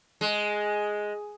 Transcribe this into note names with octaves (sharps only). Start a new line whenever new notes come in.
G#3